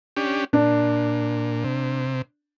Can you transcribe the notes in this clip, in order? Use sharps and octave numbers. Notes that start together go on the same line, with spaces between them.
C#4 D4 G4
A#2 D4
C3